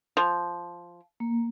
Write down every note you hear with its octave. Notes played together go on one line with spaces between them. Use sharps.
F3
A#3